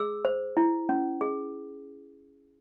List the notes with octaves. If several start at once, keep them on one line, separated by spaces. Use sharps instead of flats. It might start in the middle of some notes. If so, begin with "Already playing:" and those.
Already playing: G#4 E6
C5
E4
C#4
G#4